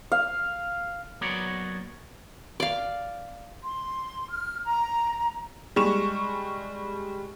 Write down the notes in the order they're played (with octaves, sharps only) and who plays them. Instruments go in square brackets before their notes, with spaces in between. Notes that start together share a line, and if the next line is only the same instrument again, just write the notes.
[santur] F5
[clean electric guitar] F#3 A#3 B3 F#4 C#5 D5
[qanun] D5 F5
[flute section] C6
F6
A#5
[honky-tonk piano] G3 G#3 C#6 E7